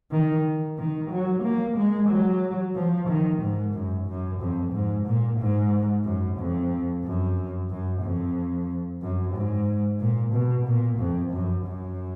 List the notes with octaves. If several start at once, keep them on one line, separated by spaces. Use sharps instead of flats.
D#3
D#3
F#3
A#3
G#3
F#3
F3
D#3
G#2
F#2
F#2
F2
G#2
A#2
G#2
F#2
F2
F#2
F#2
F2
F#2
G#2
A#2
B2
A#2
F2
F#2
F#2